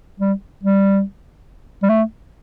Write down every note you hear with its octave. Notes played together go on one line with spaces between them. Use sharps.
G3
G3
G3
A3